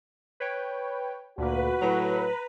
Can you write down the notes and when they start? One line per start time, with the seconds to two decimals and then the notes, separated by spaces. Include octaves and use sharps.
0.40 B4 C#5 G5
1.38 D2 A#2 A#3 F#4 B4
1.81 A2 F#3 A#5